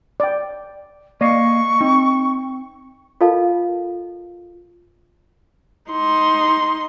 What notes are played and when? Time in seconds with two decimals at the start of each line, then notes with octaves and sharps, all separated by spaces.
0.20 D5 G5
1.21 A#3 D5 D#5 F5 C#6
1.81 C4 D#4
3.21 F4 A4 A#4 D#5 F5 A5
5.92 D#4 C6